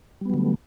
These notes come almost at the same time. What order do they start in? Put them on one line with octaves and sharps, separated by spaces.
G3 B3 F#3 D3 A3